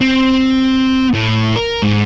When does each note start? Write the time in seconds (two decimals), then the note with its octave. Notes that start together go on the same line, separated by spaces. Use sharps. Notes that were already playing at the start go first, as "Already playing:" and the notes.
0.01 C4
1.14 A2
1.56 A#4
1.82 G#2